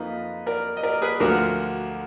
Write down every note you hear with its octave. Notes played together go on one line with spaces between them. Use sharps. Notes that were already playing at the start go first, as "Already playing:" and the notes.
Already playing: F2 F3 A#3 D#4 B4 D#5
A#4 D5
D#5
A#4 D5
G#4 B4
D2 D3 F3 F#4 A#4